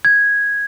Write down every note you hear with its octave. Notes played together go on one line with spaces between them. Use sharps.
G#6